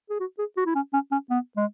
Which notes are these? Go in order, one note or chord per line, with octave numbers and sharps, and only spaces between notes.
G#4
F#4
G#4
F#4
E4
C#4
C#4
C#4
B3
G#3